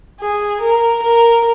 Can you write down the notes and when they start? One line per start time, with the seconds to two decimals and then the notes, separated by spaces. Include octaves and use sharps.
0.20 G#4
0.61 A#4
1.02 A#4